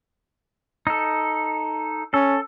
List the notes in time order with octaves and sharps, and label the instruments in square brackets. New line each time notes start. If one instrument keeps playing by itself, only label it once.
[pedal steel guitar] D#4 A4
[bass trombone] C#4 [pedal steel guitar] A4